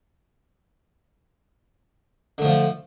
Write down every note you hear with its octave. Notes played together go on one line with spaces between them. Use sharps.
D3 F3 A3